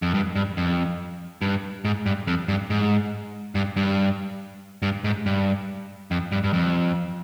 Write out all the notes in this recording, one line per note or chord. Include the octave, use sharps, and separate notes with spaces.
F2
G2
G2
F2
G2
G#2
G2
F2
G2
G#2
G2
G2
G2
G#2
G2
F2
G2
G2
F2